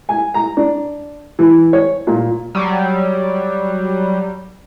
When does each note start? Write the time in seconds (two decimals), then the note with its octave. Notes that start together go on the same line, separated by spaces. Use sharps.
0.09 G#5
0.34 A#5
0.57 D4
1.39 E3
1.73 C#5
2.07 A#2
2.55 F#3 G3